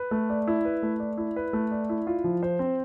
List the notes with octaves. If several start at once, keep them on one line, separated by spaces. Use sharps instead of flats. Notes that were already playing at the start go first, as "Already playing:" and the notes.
Already playing: B4
A3
D5
E4
B4
A3
D5
E4
B4
A3
D5
E4
F4
F3
C5
C4